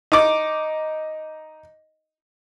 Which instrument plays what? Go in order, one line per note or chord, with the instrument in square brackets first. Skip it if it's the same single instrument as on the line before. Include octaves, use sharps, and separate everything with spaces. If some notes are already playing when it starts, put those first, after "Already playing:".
[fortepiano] D#4 D6